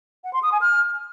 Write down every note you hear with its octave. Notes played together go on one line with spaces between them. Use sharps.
F#5
C6
D#6
G#5
F6